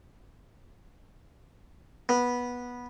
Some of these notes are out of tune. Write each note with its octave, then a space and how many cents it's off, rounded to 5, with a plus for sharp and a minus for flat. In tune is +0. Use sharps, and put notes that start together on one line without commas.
B3 -15